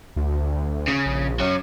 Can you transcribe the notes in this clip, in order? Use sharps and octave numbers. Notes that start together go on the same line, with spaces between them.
D2
C#3
A#1
F#3 C#4